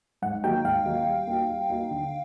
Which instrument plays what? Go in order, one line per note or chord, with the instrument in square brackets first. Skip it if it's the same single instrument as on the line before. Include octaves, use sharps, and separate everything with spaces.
[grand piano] G#2 [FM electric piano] F#5
[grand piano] D#3 F#3 A#3 D#4 [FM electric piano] G5
[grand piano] G#2 [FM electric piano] F5
[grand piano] D#3 F#3 A#3 D#4
G3
A#3 D#4 F#4
G3
A#3 D#4 F#4
D3